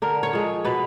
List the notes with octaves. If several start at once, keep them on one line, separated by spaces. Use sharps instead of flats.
D3 A#4
C#5
F3 G#3
B2 B4